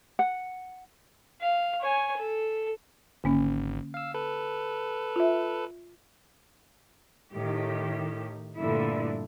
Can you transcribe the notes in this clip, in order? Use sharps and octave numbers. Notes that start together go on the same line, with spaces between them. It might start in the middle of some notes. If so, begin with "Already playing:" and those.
F#5
F5
C#5 G#5
A4
G#1 D3 A#3 C#4
F5 E6
A4 B4
F4 E5
A2 D#3 G4
G2 A#2 D3 A3 E4